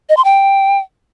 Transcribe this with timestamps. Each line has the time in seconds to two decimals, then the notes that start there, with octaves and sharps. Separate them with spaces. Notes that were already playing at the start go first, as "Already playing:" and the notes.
0.09 D#5
0.17 C6
0.25 G5